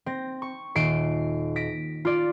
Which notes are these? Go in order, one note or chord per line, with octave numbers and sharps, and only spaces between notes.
C4 A#6
C#6
D#1 C7 D7
A#6 B6 D7
F4 D5